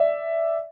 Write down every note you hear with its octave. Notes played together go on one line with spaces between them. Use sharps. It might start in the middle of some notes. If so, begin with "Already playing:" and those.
Already playing: D5 E5